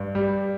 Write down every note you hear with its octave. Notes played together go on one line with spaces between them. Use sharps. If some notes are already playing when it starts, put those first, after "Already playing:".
Already playing: G2
G3